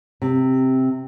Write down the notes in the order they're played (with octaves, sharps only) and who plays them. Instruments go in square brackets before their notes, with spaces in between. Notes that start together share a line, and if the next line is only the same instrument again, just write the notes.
[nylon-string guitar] C3